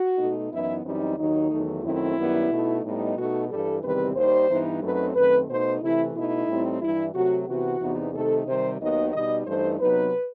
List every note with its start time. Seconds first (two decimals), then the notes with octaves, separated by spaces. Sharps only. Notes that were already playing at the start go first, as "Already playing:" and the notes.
Already playing: F#4
0.18 B2 A3 D#4
0.52 F#2 E3 B3 D#4 E4
0.85 F#2 E3 G3 C4 D#4
1.18 D#2 D#3 F#3 D#4
1.51 E2 D#3 F#3 A3
1.84 F#2 D#3 A3 C4 E4
2.17 F#2 D#3 G3 B3
2.51 B2 A3 D#4
2.84 A2 G3 B3 D#4
3.17 B2 A3 D#4 F#4
3.50 G2 E3 G3 A4
3.83 E2 C3 D#3 G3 C4 B4
4.16 D#2 D#3 G3 C5
4.49 G2 E3 B3 D#4
4.82 F#2 F#3 A3 C4 D#4 B4
5.15 F#2 D#3 A3 C4 B4
5.48 B2 A3 D#4 C5
5.82 C3 E3 A3 E4
6.15 B2 A3 D#4 E4
6.48 A2 G3 C4 D#4
6.81 G2 E3 G3 E4
7.14 C3 F#3 A3 F#4
7.47 C3 E3 B3 F#4
7.80 E2 C3 E3 B3 D#4
8.13 C3 D#3 A3 D#4 A4
8.46 C3 D#3 G3 C5
8.80 D#2 D#3 F#3 B3 D#4 D#5
9.13 B2 G3 D#4 D#5
9.47 G2 E3 A3 D#4 C5
9.79 C3 F#3 B3 D#4 B4